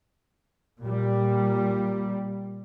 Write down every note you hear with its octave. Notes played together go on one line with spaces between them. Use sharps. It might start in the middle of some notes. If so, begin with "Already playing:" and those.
A#2 G3